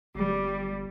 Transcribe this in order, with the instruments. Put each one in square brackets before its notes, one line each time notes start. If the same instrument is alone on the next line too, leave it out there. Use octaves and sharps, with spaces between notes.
[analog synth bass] G1 [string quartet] G3